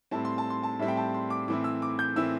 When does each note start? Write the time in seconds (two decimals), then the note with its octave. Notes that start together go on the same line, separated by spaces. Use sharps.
0.11 A2 G3 C4 E4 A5
0.25 C6
0.38 A5
0.50 C6
0.63 A5
0.79 A2 G3 C4 E4 E5
0.88 G5
0.97 A5
1.14 C6
1.30 D6
1.48 A2 E3 C4 E4 D6
1.64 E6
1.82 D6
1.99 G6
2.16 A2 E3 C4 E4 E6